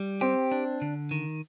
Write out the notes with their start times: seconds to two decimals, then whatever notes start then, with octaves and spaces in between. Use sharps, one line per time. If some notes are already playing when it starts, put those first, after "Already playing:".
Already playing: G3
0.21 C4 G4
0.52 D4
0.82 D3
1.11 D#3